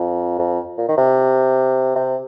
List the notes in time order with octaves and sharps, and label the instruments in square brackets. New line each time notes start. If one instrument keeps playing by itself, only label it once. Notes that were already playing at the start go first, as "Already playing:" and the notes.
Already playing: [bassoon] F2
F2
A#2
D#3
C3
C3